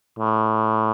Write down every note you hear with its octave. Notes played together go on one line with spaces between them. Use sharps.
A2